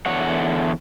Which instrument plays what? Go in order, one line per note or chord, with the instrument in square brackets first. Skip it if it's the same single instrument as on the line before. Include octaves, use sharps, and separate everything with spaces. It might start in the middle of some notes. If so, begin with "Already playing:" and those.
[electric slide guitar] E2 D3 C#5 F#5